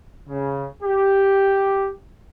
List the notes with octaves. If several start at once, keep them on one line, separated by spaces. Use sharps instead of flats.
C#3
G4